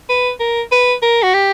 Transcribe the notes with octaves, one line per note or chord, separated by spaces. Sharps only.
B4
A#4
B4
A#4
F#4
G4